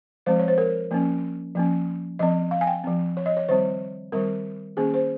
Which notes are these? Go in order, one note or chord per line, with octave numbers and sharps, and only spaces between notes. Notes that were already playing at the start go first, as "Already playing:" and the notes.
F3 G#3 C4 C5
C#5
C5
A#4
F3 A#3 C#4
F3 A#3 C#4
F3 C4 D#5
F5
G#5
G5
F3 C4
C#5
D#5
C#5
D#3 G3 C4 C5
D#3 G3 C4 A#4
D#3 A#3 C#4 G#4
C5